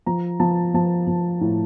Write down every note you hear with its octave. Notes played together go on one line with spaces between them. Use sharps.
F3 A#5
F3 A5
F3 A5
F3
A2